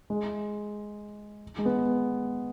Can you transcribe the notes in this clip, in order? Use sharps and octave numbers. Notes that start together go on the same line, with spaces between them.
G#3
G#3
B3